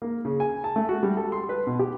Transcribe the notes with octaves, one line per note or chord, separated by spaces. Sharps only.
A#3
C#3
G#5
A5
A3
F#4
G3
A4
C6
B4
B2
G4